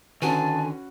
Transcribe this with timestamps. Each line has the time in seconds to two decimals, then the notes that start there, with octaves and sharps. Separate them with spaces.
0.22 D3 D#3 C#4 F#4 B4 G#5 A5